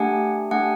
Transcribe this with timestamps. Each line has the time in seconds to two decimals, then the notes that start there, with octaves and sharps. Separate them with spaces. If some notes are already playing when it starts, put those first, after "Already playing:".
Already playing: A3 D4 G4 F#5 G#5
0.51 A3 D4 G4 F#5 G#5